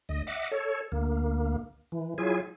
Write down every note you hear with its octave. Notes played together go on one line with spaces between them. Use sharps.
D2 D#5
D#5 E5 F#5 D6
A4 C#5
D2 A#3
E3
F#3 E4 F4 G#4 G#5